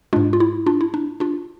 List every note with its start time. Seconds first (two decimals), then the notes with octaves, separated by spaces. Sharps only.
0.13 G#3 D4 F4
0.16 G#2
0.33 F4
0.40 E4
0.66 D4 F4
0.81 E4
0.94 D4
1.20 D4 F4